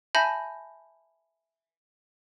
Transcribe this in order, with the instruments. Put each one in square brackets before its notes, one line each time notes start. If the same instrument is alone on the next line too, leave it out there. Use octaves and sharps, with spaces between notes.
[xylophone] E5 G#5 A5 B5 G6 A#6